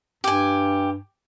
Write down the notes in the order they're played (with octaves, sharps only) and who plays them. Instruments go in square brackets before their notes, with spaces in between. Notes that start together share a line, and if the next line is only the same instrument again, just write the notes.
[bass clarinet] G2 [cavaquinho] G4 G#5